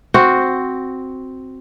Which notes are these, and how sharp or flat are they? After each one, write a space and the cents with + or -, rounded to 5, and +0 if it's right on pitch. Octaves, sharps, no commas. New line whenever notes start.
C4 +0 F#4 +0